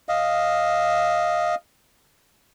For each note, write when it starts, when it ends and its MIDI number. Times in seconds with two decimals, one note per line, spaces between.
0.09 1.55 75
0.09 1.55 77